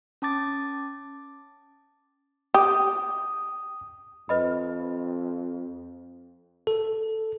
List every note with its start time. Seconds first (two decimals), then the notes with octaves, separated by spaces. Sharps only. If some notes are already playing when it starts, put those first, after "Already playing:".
0.22 C#4 A5 D6 A6
2.54 G4 D#6
4.29 F2 B4 D#5 B5
6.67 A4